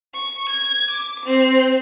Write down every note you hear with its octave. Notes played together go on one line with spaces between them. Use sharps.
C#6
G#6
D6
C4